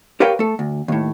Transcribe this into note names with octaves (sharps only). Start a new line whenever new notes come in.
G4 A#4 B4 C#5 F5 G5
A3 A4
D2
D#2 A2